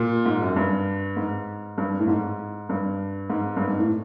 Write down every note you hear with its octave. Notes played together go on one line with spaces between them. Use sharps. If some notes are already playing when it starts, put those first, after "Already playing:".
Already playing: A#2
G#2
F#2
G2
G#2
G2
A2
G#2
G2
G#2
G2
G#2
A2